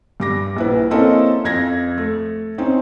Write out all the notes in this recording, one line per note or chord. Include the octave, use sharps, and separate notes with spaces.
G2 D6 A#6
A#1 E4 B4
A#3 C4 C#4 E4 A4 D#5
F2 G#6 A#6
A3
C4 C#4 D#4